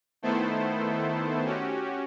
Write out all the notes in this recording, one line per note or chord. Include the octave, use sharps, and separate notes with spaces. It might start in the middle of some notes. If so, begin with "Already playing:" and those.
D#3 A3 B3 E4 A4 C5
C#4 F#4 G4